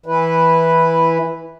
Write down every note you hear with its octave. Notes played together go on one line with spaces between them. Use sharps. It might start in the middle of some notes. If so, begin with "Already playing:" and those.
E3 E4 B4